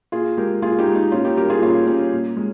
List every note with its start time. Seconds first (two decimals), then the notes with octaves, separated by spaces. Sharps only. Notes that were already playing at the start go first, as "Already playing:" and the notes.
0.12 A#2 F4 G#4
0.37 G#3 G4 A#4
0.62 A#2 F4 G#4
0.79 D#4 G4
0.87 G#3
0.95 D#4
1.12 A#2 C#4 F4
1.24 D#4 G4
1.37 G3 G4 A#4
1.50 F4 G#4
1.62 A#2 C#4 F4
1.87 G3 C#4
2.12 A#2
2.37 G#3